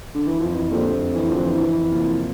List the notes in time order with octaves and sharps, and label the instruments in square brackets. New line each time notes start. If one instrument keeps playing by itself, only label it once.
[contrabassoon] D3
E3
[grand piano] F2 [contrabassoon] F3
[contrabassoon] E3
[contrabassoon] A#2 [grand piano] D3 A3 C4 G4
[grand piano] F2
[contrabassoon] E3
[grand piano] D3 A3 C4 G4 [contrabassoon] F3
[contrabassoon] E3
[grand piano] F2 [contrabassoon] E3
[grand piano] C3 F3 A#3 F4